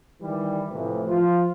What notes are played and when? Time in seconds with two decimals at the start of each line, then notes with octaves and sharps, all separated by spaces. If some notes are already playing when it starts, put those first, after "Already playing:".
0.21 D#3 E3 G3
0.70 A2 C3 E3 F3 C4
1.07 F3 F4